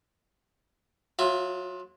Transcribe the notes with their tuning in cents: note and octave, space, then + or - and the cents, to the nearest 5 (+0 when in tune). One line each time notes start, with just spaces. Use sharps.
F#3 -25 F4 +15 E5 +15